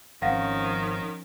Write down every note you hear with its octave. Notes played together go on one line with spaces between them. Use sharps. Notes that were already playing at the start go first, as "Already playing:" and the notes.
G#1 D#3 F3 C#4 F5 F#5 A#6